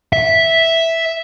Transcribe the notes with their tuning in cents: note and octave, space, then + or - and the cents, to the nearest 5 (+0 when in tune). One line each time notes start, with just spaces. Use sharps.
E5 -5